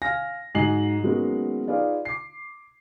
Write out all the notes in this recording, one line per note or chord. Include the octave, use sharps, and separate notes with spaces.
F5 G#5 F6 A#6
G#2 F#3 D#5 G#5 C7 F#7
D#3 F#3 G#3 A#3 B3 C#4
D#4 F4 G#4 B4 D5 F5
D6 C7